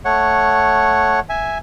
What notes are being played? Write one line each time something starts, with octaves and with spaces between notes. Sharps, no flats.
A3 C#5 F#5
E5 G#5